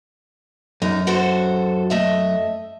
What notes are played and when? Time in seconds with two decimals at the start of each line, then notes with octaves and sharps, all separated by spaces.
0.82 F#2 D#4
1.07 F#4 A4 C5
1.90 A3 D#5 E5